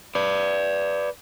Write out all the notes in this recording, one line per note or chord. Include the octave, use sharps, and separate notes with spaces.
B4 D5